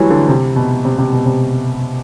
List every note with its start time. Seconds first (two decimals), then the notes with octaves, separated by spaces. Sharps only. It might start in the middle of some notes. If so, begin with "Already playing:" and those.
Already playing: E3 F#3 G3 A3
0.10 D3
0.29 C3
0.56 B2
0.85 C3
0.98 C3
1.13 B2
1.26 C3